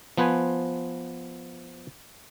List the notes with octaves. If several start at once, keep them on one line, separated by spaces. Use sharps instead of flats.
F3 B3 B4 C5 G#5